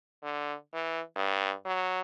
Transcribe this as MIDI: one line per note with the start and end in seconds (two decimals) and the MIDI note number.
0.23 0.55 50
0.74 1.01 52
1.16 1.53 43
1.66 2.01 54